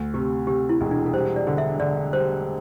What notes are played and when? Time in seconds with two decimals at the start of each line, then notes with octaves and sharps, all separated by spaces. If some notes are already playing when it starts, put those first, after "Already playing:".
Already playing: D2
0.14 C3 G4
0.47 C3 G4
0.69 E4
0.81 E1
0.91 D4
1.06 A4
1.13 G3 C5
1.36 D5
1.47 D3
1.58 E5
1.80 D3 D5
2.13 G3 C5